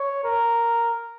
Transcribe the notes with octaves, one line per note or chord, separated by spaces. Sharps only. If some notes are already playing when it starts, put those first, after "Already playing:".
Already playing: C#5
A#4